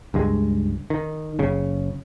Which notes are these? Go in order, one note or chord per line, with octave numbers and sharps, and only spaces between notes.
C#2 G2 G#3
D#3
F#1 C#3